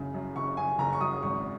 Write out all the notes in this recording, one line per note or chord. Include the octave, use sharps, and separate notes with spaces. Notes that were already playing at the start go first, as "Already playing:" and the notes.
Already playing: F#1 F#2 C#3
F#2
F#1 C#6
C#3 G#5
F#1 A#5
C#6
F#2 D#6
G#1 C#6